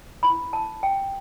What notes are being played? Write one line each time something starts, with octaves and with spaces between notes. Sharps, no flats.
E4 B4 B5
A5
G5